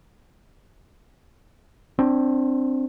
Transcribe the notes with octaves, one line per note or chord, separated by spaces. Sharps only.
C4 D4